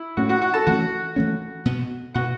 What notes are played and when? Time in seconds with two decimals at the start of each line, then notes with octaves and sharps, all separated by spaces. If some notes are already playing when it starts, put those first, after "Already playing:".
Already playing: E4
0.17 A2 A3 C#4 F#4 F#5
0.29 F#4 F#5
0.42 F#4 F#5
0.54 A4 A5
0.67 E3 A3 C#4 F#4 F#5
1.16 E3 A3 C#4
1.65 B2 B3
2.14 B2 B3 F#4 F#5